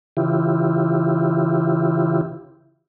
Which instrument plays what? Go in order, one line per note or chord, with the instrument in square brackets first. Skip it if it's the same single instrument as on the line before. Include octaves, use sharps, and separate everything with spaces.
[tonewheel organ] C#3 E3 E4 F4 G4